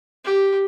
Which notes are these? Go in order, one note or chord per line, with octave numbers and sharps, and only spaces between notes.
G4